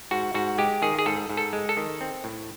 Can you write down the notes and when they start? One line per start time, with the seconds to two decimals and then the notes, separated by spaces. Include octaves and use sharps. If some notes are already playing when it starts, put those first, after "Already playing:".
0.11 G#2 F#4
0.34 G#2 F#4
0.58 G#3 G4
0.82 D#3 G#4
0.99 G#4
1.06 G#2 A4
1.30 G#2
1.37 A4
1.53 G#3
1.69 A4
1.77 D#3
2.01 C4
2.24 A2